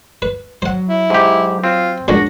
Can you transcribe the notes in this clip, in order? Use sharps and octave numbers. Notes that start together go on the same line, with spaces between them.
B4
F#3 C5 F#5
E4
G#2 G4
C4 F4
C#2 A#2 C#3 D4 F#4 A#6